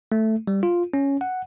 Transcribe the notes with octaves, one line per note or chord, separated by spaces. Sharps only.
A3
G3
F4
C#4
F#5